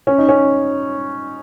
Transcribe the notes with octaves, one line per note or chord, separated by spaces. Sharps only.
C#4
D#4
C#4